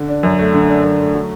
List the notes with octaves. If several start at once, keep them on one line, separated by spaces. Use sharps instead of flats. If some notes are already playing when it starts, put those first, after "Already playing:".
Already playing: D3
D4
F#2
A3
D3
D4
F#2
A3
F#3